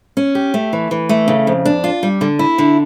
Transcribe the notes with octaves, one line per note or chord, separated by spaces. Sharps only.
C#4
G4
A3
E3
E3
A3
C#3
F2
D4
F4
G3
D3
E4
D3